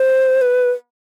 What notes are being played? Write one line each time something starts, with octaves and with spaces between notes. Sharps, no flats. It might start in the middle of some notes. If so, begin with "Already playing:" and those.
Already playing: C5
B4